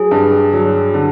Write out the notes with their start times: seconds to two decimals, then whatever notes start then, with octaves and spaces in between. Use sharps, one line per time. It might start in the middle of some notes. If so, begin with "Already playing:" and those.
Already playing: F#3 G#4
0.11 G2
0.53 F#3
0.94 D3